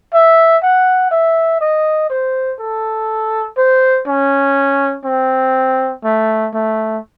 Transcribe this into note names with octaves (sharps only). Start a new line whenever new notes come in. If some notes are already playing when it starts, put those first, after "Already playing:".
E5
F#5
E5
D#5
C5
A4
C5
C#4
C4
A3
A3